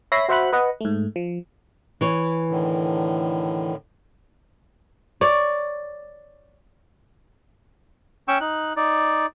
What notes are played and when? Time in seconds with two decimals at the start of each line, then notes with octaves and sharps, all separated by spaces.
0.12 C#5 E5 B5 A#6 C7
0.29 F#4 C5 E5 F#5 B5 F#6
0.53 B4 D#5 F#5
0.81 G#2 A3
1.16 F3
2.01 E3 C#5
2.50 A2 D3 D#3
5.21 C#5 D5
8.28 C#4 G5 C#6 E6
8.41 D#4 F#6
8.76 D#4 D5